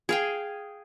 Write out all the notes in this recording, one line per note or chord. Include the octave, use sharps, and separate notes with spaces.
G#4 F5 G5